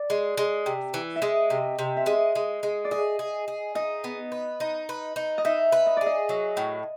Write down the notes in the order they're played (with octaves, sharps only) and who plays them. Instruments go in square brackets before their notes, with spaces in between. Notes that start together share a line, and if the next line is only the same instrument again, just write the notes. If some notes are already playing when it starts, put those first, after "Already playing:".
Already playing: [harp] D5
[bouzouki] G#3
G#3
C3
E3
[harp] E5
[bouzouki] G#3 [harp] D#5
[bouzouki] C3
C3
[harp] E5
[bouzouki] G#3 [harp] D#5
[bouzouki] G#3
G#3
[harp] D5
[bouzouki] G#4 [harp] D#5
[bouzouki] G#4
G#4
[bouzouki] D#4 [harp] D#5
[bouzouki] B3
B4
D#4
B4
D#4
[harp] D#5
[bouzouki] D#4 [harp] E5
[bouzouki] B4
[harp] D#5
[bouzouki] G#4 [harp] D5
[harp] D#5
[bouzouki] F#3
A2